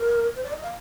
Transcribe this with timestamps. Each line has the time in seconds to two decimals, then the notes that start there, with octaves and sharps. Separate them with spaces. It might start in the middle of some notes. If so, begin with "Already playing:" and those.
Already playing: A#4
0.36 C5
0.44 D5
0.53 D#5
0.63 F5